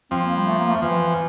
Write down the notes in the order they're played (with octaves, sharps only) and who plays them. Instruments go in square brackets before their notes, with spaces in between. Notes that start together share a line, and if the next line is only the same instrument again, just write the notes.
[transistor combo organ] F2 F3 [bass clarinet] C4
[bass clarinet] A#3
G3
A3
A#3
A3
[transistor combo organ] F2 F3 [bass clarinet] E3